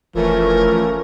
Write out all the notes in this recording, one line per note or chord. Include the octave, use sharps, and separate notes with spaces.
F1 E3 F3 A3 C#4 A#4